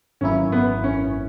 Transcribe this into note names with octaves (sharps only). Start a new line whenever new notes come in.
G#1 F#2 E3 A#3 C#4 E4
B3
C#4